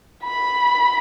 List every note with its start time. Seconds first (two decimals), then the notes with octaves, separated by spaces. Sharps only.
0.24 B5